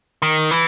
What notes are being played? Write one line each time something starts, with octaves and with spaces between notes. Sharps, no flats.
D#3
E3